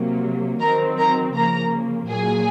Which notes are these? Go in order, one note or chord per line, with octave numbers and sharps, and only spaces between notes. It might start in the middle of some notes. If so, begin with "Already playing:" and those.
Already playing: C3 F#3 A#3
D#3 F#3 C4 A#4 A#5
A#4 A#5
C#3 F3 A#3 A#4 A#5
A#2 F#3 A#3 G#4 G#5